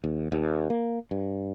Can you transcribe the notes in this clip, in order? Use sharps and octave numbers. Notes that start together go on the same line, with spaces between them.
D#2
D#2
A#3
G2